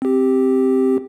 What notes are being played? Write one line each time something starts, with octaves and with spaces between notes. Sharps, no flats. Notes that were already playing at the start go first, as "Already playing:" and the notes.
C4 G4